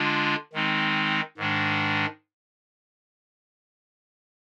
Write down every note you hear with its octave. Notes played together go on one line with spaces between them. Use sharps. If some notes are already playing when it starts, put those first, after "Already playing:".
Already playing: D3 G#3 D4 F4
D#3 G#3 C4 D#4
G#2 D#3 G#3 D4